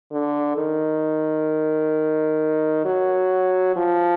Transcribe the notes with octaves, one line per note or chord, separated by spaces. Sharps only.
D3
D#3
F#3
F3